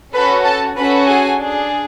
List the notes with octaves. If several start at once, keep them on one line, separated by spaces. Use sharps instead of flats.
C#4 F#4 A4 B4 B5
A4 A5
C#4 F#4 A4 B4 B5
G#4 G#5
D4 G#4